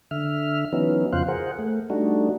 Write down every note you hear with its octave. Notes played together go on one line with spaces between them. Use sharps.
D3 E5 F6
E3 F#3 B3 C#4 D#4
F2 C#3 F4 C5 F5 F#6
G#4 A#4 C5 F#5
A3
G3 A3 D4 D#4 F#4